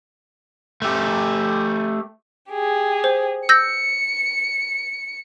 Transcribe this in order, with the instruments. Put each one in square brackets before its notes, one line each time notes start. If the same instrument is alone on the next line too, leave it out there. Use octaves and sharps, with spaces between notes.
[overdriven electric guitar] A3 G4
[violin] G4 G#4
[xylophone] C5
[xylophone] E6 G6 A#6 [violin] C#7